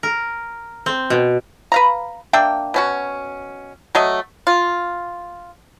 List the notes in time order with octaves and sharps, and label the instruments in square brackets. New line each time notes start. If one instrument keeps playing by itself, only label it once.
[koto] A#4
C4
B2
[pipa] B4 F5 A#5
A#3 D4 E5 G5
B2 C#4 F#4
F#3 A3 D#5
F4